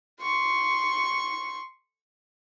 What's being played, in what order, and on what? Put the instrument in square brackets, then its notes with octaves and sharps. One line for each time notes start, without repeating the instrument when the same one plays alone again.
[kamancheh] C6 C#6